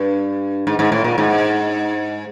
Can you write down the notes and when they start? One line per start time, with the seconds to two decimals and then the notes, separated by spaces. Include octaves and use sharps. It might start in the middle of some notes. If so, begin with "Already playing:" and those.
Already playing: G2
0.67 G#2
0.79 G#2
0.92 A2
1.04 A#2
1.18 G#2